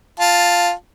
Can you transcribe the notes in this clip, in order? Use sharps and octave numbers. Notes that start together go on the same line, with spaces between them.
F4 A5